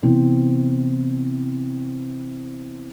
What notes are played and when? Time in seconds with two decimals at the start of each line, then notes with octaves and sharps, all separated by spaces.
0.03 C3 E3 B3 C4